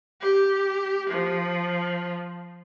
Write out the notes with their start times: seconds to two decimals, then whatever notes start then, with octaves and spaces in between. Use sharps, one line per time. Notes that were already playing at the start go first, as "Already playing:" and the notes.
0.21 G4
1.10 F3